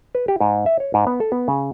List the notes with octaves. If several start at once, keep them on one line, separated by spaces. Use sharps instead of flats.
B4
G4
G#2
E5
C#5
G#2
B3
A4
B3
C#3